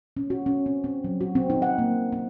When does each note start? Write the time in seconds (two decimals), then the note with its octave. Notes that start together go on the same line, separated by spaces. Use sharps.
0.17 C#4
0.30 F#4
0.46 C#4
0.66 C4
0.84 C4
1.04 F#3
1.21 F#4
1.35 C4
1.50 D#4
1.62 F#5
1.78 A#3
2.12 C4